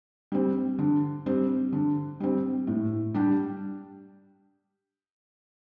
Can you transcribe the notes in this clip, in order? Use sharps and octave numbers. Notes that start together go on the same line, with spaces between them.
G3 C4
D3
G3 C4
D3
G3 C4
A2
G3 D4 G4